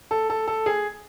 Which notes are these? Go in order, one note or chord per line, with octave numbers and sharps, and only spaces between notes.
A4
A4
A4
G#4